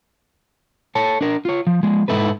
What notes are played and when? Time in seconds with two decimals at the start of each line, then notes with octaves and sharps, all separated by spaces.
0.95 A4 C#5 A5
1.21 D4 A#4
1.45 F4 C#5
1.67 F3
1.83 F3 G#3
2.08 G#2 C#3 D#4 E4 A4 B4